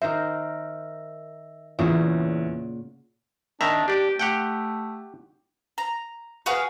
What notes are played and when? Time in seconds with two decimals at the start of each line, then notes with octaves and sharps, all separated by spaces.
0.02 D#3 A#4 C5 E5
1.79 E2 A#2 C#3 F#4 E5
3.61 D#3 D4 E5 A#5
3.88 D4 G4 D5
4.19 A3 G4 F#5 G5
5.78 A#5
6.46 F#4 G#4 B4 F5